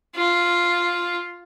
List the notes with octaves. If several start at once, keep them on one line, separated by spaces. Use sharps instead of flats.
F4